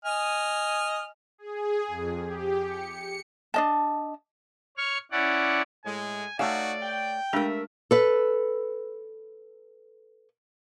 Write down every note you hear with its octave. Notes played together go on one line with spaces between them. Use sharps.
D#5 G#5 F6
G#4
F2
G4
C#7
D4 D#5 A5
C#5 C#6 F6
C#4 E4 D5 F#5
A2 G#3 G#5
A3 D#4 F#4 C#5 D5 F5 G#5
G5
G#3 A3 D4 G4 A#4 E5
A4 B4